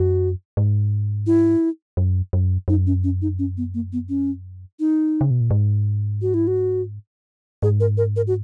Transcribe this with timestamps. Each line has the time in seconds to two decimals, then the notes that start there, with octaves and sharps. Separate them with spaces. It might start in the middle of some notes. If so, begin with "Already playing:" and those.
Already playing: F#2 F#4
0.57 G#2
1.27 E4
1.97 F#2
2.33 F#2
2.68 F#2 D#4
2.87 C#4
3.04 C#4
3.22 D#4
3.39 C#4
3.57 B3
3.74 A#3
3.93 B3
4.09 C#4
4.80 D#4
5.21 C#3
5.31 B2
5.41 A#2
5.51 G#2
6.22 F#4
6.34 E4
6.47 F#4
7.63 G#2 G#4
7.80 A#4
7.97 A#4
8.16 A#4
8.27 F#4